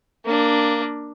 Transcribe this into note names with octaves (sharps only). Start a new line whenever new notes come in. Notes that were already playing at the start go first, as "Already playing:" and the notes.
A#3 D4